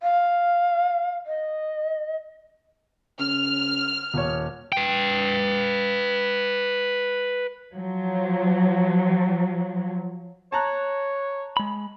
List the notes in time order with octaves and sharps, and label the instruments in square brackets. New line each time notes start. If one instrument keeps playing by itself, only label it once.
[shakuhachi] F5
D#5
[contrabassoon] C#3 [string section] F6
[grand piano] D#1 C#5
[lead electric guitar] B4 G5
[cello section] F3 F#3
[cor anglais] C#5 [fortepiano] A5 A#5 F#6
[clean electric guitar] G#3 B5